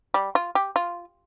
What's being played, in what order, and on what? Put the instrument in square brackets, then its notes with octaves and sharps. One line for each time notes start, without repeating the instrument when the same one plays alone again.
[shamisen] G3
F4
G4
F4